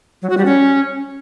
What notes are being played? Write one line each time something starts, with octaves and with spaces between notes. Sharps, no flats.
F#3
F#4
G3
C#4